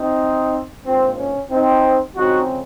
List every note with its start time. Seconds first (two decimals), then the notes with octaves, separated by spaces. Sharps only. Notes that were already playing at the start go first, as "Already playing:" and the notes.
Already playing: C4 D#4
0.84 A#1 G#2 F3 C4
1.16 C#4
1.49 C4 D#4
2.14 F2 C#3 G#3 C4 D#4 F#4